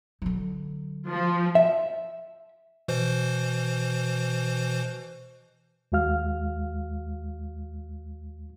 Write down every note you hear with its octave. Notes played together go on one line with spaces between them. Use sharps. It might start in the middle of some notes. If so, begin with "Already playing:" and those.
D3 F#3
F3
E5
B2 E3 C5
D#2 G#3 F#4 F5 F6